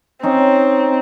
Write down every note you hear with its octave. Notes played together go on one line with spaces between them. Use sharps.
C4 C#4 D#4